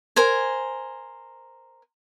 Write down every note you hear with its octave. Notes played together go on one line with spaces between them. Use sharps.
A#4 C5 G#5